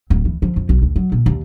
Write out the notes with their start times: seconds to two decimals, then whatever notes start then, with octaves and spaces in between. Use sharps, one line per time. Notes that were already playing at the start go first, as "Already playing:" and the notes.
0.10 D1
0.25 E3
0.42 F3
0.56 F2
0.69 B1
0.82 D2
0.96 F#3
1.12 A#2
1.26 D#2